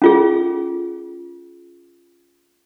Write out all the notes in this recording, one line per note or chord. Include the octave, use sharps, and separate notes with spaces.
C#4 F4 G#4